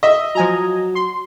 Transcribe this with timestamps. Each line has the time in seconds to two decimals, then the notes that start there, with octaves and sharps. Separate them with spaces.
0.03 D#5 E5
0.35 F3 F#3 G#5 A#5
0.95 C6